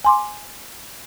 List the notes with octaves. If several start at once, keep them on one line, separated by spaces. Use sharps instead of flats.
G#5 C6 D6